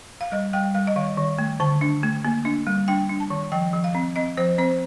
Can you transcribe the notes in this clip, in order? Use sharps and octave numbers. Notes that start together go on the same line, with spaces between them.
F5
G3 D#5
G3 G5
G3 F5
D#5
D#3 F5
D#3
A3
D3 A5
D4
A3
A#3
D4
G3
D4 G5
D4
A5
D#3
F3 G5
F3
F5
C4
C4 D#5
F3 C5
C4 C5